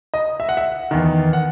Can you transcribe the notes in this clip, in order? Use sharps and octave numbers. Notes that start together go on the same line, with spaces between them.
D#5
E5
F#5
E5
E2 D#3
F#5